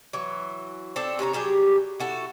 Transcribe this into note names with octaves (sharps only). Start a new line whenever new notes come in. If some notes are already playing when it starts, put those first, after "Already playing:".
E3 F#3
C4 D4 A4
C3 C#4 B4 A#5
F#3 G3 G4 G#4
E4 F#4 A4